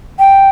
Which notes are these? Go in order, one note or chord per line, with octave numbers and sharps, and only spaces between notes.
G5